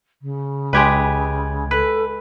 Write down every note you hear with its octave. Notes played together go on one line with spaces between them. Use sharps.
C#3
C#2 G#3 G4 B4 G#6
A4 B4